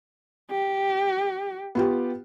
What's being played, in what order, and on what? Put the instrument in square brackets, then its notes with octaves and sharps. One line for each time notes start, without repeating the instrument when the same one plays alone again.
[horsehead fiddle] G4
[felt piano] B3 F4 G4